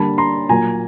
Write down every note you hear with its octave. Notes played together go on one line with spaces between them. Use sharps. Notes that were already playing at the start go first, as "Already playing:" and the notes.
Already playing: D3 G3 A#3 A5 B5
A#5 C6
A#2 F#3 A#3 G#5 A#5